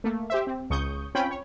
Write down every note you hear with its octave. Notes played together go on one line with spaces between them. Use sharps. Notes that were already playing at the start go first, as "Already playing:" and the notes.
A3 A#3
G4 C5 E5
C4
C#2 C#3 C#6 D#6 G6
C4 C#4 F4 G5 B5
C#5